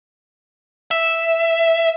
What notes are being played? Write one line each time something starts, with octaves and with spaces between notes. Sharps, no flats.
E5